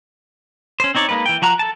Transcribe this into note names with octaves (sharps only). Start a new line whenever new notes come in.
C#4 C5
C4 D#4 C#5 D5
G#3 A#3 D#4 B4
E3 G5
F3 F#4 A#5 F#6
A4 A5